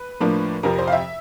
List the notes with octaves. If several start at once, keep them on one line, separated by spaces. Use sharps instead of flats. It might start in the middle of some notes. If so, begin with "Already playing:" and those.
Already playing: B4
A2 F3 A#3 D4
F2 C3 F3 A#4
C5
F5
E5